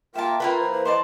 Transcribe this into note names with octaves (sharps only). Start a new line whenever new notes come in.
A#3 F4 A#4 E5 G5 A5
A#3 F4 A#4 B4 G5
E3 C5
C5
C5 D5 D#5 A5